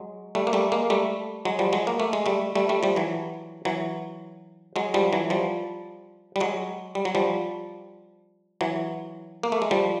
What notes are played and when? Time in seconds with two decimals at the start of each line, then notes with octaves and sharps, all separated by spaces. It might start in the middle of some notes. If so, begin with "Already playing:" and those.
Already playing: F#3 G#3
0.35 G3 A3
0.47 A#3
0.53 G3 A3
0.72 G#3 A#3
0.90 G3 A3
1.45 F#3 G#3
1.59 F3 G3
1.73 F#3 G#3
1.87 A#3
2.00 A3
2.13 G#3
2.26 G3 A3
2.55 G3 A3
2.69 G3 A3
2.83 F3 G3
2.96 E3 F#3
3.65 E3 F#3
4.76 F#3 G#3
4.94 F3 G3
5.13 E3 F#3
5.30 F3 G3
6.36 G3
6.40 F#3 G#3
6.95 G3
7.05 F#3
7.15 F3 G3
8.61 E3 F#3
9.43 A#3
9.52 A3
9.62 G#3
9.71 F3 G3